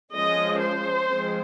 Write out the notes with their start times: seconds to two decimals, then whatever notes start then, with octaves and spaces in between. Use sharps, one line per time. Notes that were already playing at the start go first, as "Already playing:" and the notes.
0.14 F3 G#3 C#4 D#5
0.61 C5
1.07 F3 G#3 C4